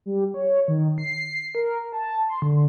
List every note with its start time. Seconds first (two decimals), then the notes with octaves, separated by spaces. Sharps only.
0.06 G3
0.34 C#5
0.68 D#3
0.98 C7
1.55 A#4
1.93 A5
2.29 C6
2.42 D3